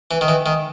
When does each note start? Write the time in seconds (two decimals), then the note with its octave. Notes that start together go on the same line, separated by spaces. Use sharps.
0.11 E3
0.21 D#3
0.28 E3
0.46 D#3